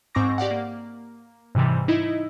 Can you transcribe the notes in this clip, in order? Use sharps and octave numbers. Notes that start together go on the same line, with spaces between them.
G#2 C4 A#5 C#6 D6 A#6
G4 D5 F5 F#5
A#3
G#2 C3 E3 G3
D#4 E4 D#5